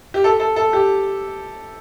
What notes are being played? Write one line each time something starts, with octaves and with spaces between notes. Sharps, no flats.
G4
A4
A4
A4
G4